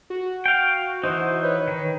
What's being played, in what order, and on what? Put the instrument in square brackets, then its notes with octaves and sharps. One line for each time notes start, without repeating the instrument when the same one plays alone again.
[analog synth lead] F#4
[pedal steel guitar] F5 G5
[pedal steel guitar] E3 D#4 [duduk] C5
[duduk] B4 [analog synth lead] C#5
[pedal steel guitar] D#3